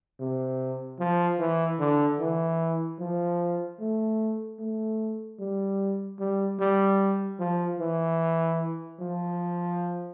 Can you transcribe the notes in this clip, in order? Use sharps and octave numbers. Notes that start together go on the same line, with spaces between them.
C3
F3
E3
D3
E3
F3
A3
A3
G3
G3
G3
F3
E3
F3